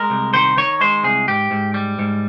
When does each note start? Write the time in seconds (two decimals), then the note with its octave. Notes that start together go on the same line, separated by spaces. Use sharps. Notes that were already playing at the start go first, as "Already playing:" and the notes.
Already playing: G#3 A#4
0.10 C2
0.34 D#3 C5
0.58 D#3 C#5
0.81 G#3 C5
1.04 C2 G#4
1.28 G#2 G4
1.51 G#2
1.74 G3
1.99 G#2